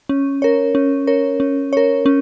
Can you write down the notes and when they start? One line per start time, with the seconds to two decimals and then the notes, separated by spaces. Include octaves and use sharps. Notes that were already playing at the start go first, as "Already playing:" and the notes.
0.09 C#4
0.42 A#4 C#5
0.75 C#4
1.07 A#4 C#5
1.40 C#4
1.73 A#4 C#5
2.06 C#4